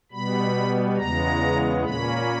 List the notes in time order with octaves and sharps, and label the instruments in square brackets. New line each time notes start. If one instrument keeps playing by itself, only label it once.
[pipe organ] B2 G3 B3 B5
E2 C#3 G#3 B3 A#5
A#2 A#3 C#4 B5